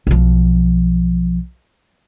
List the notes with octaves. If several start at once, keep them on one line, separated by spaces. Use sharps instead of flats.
B1 F3